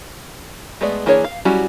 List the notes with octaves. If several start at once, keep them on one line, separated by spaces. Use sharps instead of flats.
G#3 A3 B3 D5
E3 A#3 D4 G#4 C#5
F5
F#3 G3 C#4 E4 F#4